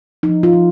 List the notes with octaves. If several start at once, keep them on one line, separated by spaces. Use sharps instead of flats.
F3 D#4
F4
F3